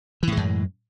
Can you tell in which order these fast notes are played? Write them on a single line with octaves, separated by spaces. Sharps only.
E3 A2 G#3 F#2